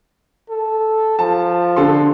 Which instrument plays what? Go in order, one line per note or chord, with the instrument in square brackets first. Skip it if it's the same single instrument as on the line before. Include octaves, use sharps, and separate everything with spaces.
[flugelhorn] A4
[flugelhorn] F3 [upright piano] A5
[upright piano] D3 A4 C6